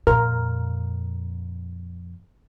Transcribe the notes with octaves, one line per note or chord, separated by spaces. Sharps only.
F2 A#2 A#4